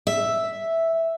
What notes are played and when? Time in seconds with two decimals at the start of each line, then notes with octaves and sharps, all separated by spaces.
0.07 E5